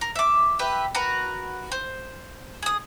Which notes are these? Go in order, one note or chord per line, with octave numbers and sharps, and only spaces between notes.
A#4
E5 D6
G4 B4 E5
F#4 A#4 B4
C5
G#4 D#6